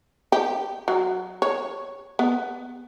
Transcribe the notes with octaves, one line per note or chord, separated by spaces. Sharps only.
G4
F#3
C#5
B3